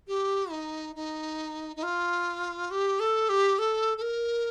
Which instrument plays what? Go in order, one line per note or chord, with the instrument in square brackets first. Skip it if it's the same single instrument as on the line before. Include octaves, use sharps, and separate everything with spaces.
[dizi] G4
D#4
D#4
D#4
F4
G4
A4
G4
A4
A4
A#4